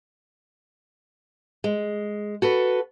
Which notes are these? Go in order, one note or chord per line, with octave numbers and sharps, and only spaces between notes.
G#3
F#4 A4 B4